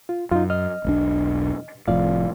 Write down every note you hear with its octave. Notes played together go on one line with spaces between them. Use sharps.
F4
F#2 D#4 F4
D#5 F6
E1 B1 D4
F1 F2 A2 F4 D5 F5